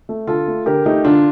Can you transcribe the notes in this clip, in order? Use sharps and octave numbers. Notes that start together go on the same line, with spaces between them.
A3
D3 F4 A4
A3
D3 G4 A#4
A3 D#4 G4
D3 D4 F4